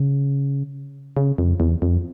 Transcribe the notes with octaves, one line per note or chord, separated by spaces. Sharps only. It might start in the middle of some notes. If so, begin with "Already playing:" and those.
Already playing: C#3
C#3
F2
E2
F2